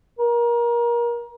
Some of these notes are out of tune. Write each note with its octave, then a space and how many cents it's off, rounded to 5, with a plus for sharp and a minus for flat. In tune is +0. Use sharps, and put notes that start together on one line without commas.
A#4 +25